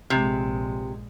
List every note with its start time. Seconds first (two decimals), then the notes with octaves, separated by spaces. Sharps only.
0.10 A#1 G2 C3 G#3